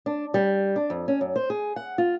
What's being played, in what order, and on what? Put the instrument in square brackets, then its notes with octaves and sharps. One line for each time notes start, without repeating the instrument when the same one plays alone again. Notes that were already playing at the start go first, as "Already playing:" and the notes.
[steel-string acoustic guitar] D4
G3
D4
F2
C#4
F#2
C5
G#4
F#5
F4